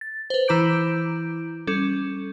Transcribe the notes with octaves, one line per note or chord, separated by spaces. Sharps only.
A6
B4 C5
E3 E4 A#5 D6 G6 D7
G3 C#4 A4